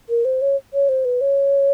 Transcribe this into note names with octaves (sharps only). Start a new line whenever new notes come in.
A#4
C5
C#5
C#5
C5
B4
C#5